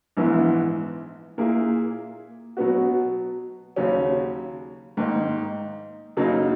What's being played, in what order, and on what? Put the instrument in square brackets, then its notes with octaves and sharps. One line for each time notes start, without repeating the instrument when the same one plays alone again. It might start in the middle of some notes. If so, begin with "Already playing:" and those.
[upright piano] A#1 G#2 E3 B3 E4
A#2 A#3 E4 G#4
B2 F#3 B3 F#4
D#2 C#3 F#3 C#4
G#2 D#3 A#3 D#4
F#2 C#3 F#3 A#3 D#4